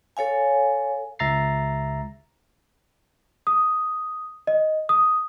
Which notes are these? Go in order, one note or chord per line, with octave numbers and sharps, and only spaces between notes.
A4 C#5 F5 G#5
C#2 E5 A#5 A6 C7
D#6
D#5
D#6